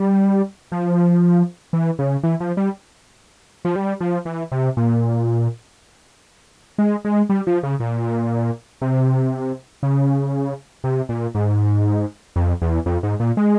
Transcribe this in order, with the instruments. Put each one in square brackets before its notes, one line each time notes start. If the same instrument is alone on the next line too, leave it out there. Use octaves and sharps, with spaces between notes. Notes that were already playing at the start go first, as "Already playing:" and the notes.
Already playing: [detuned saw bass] G3
F3
E3
C#3
E3
F3
G3
F3
G3
F3
E3
C3
A#2
G#3
G#3
G3
F3
C#3
A#2
C3
C#3
C3
A#2
G#2
F2
E2
F2
G#2
A#2
G#3